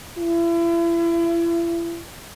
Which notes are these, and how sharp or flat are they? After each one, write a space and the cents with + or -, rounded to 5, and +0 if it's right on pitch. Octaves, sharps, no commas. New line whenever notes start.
E4 +40